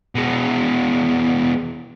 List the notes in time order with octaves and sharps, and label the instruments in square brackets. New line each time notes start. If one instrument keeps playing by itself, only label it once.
[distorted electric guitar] B2 G#3